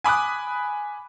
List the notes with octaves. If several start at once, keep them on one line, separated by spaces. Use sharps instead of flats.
G#5 B5 D6 D#6 F#6